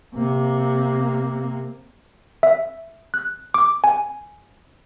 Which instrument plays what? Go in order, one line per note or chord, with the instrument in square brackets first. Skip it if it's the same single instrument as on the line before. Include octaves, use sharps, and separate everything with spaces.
[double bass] C3 A#3
[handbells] E5
F#6
D6
G#5